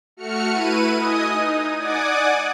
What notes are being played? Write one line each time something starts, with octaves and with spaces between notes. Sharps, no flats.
A3 F#4 F6 C#7
E4 B4 D#7
D#5 G#5 D#6
D#4
D5 F#5 G#5 D6 D#6